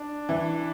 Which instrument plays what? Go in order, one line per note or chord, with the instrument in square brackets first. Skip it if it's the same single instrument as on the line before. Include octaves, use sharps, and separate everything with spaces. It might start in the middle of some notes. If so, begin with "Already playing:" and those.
Already playing: [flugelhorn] D4
[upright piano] E3